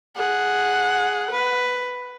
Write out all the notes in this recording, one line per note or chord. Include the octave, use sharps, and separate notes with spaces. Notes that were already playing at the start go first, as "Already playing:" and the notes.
G#4 F#5
B4